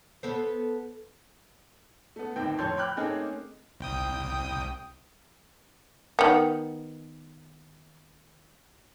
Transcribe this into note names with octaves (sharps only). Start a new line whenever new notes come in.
B3 A4 C5
A3 B3
G1 D#2 D#3 C4 G5
F2 A2 A4 C#5 C6 G6
G5 B5 D6 F6 F#6
A3 A#3 C4 C#4 D#4 G#4
C2 G5 D#6
D#3 B3